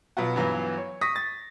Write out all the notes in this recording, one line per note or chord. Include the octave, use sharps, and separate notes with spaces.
B2 F#3 B3 F4 F#4
G2 E3 F#3 B3 F4
C#5
C#6 D#6 A#6 B6
A6